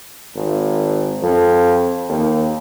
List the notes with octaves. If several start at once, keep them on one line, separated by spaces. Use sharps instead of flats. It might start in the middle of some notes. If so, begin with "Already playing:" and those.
G#1
F2
D#2